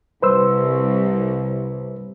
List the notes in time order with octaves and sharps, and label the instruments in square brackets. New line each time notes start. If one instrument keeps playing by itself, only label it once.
[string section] C2 [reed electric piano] B4 C5 E6